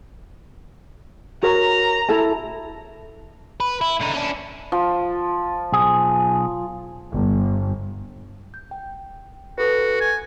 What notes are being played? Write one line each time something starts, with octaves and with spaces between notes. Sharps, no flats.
F#4 A#4 C#5 A#5
E4 A4 A5
B4
E4
D3 D#4
C#4 D4
F3
B1 G#4
G1
G6
G5
F#4 A4 B4
G#5